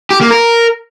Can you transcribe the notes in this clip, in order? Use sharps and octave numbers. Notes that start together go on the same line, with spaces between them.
G4
A#3
A#4